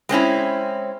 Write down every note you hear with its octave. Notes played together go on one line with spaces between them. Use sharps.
G#3 C4 C#4 E4